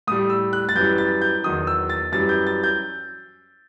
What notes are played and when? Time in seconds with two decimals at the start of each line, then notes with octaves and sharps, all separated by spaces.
0.07 A2 G3 D#6
0.30 E6
0.53 F#6
0.69 A6
0.75 F#2 E3 G3 G6
0.98 A6
1.22 G6
1.44 E2 D#3 F#3 D#6
1.67 E6
1.90 A6
2.12 F#2 E3 G3 A6
2.29 G6
2.47 A6
2.63 G6